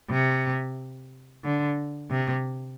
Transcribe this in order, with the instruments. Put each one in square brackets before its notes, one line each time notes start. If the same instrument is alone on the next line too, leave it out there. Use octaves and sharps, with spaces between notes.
[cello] C3
D3
C3